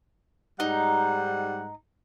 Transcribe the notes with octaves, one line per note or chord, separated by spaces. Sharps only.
G#2 G3 D#4 F#5